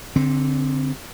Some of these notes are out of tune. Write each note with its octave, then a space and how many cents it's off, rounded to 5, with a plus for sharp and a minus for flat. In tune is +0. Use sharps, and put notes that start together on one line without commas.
D3 -20 C4 +0